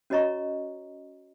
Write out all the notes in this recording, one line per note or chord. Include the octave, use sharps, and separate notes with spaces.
C#4 F#4 C#5 D#5 A#5 C#6